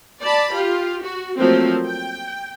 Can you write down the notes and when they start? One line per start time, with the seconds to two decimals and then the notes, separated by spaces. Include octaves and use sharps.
0.22 D5 A5 B5
0.54 F4 G4
1.04 F#4
1.38 F3 F#3 A3 A#3 C4
1.85 G5